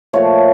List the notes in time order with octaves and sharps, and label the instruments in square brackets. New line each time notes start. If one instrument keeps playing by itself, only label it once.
[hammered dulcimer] A#2 F3 A3 C#5